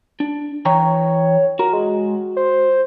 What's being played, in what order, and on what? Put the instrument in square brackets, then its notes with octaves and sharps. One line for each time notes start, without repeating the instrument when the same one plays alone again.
[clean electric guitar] D4
[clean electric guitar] E3 G5 A#5 [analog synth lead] C#5
[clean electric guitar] F#4 [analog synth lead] A#4
[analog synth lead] G#3
C5